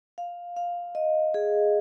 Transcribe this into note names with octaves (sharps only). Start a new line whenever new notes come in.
F5
F5
D#5
G#4